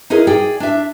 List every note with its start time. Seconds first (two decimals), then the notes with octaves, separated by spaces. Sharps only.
0.10 D#4 E4 G#4 A#4 B4
0.27 G#4 D5 G5 G#5
0.60 D4 E5